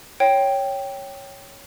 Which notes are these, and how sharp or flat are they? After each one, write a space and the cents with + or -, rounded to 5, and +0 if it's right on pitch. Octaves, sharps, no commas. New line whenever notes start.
C#5 +0 G5 +0